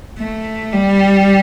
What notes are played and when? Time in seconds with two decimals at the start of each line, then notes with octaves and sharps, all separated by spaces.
0.20 A3
0.73 G3